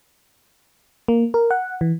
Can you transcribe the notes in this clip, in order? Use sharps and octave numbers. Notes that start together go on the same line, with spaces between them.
A#3
A#4
F#5
E3